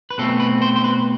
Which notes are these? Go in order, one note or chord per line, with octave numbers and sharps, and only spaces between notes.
B4
B2 A3 C4 A4
B4
C5
C5
B4